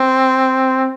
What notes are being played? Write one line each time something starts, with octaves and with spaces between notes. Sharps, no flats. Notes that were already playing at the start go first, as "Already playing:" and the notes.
Already playing: C4